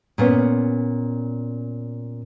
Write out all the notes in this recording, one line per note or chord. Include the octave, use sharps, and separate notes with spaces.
A#2 B3 C#4